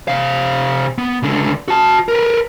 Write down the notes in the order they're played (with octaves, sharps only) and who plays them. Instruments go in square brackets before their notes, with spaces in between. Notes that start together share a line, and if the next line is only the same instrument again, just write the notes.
[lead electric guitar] C3 F5
B3
C#2 D3
F#4 A5
A#4 B4